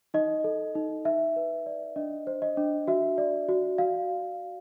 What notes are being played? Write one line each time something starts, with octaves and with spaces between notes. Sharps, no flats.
D#4 D#5
A4
D#4
D#4 E5
B4
D5
D4 D#5
C5
D#5
D4
F#4 E5
D5
F#4
F#4 F5